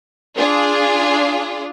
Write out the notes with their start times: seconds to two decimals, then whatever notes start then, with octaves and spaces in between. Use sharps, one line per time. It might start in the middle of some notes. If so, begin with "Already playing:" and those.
0.37 D4 F4 G#4